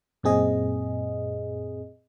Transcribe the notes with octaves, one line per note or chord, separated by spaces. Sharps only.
F#2 A#2 C4 G#4 D#5